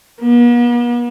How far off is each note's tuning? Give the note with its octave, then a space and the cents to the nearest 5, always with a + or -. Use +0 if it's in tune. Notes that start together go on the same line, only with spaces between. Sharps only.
B3 -45